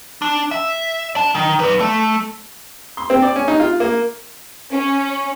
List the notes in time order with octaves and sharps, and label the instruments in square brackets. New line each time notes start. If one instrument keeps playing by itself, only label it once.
[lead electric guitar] D4
E5
D5 A5
D#3
B4 D5
A3
[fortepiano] C6
C4
D5
C#4
D#4
F4
A#3
[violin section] C#4